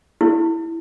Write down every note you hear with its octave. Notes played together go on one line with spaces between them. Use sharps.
E4